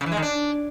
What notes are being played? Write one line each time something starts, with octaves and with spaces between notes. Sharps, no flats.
C#3
E3
G#3
D#3
D4